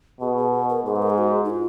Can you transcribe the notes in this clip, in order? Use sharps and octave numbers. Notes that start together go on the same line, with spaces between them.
B2 G#4
G#4
B4
A#4
G#2 G#4
B4
A#4
G#4
F#4
D#4
F4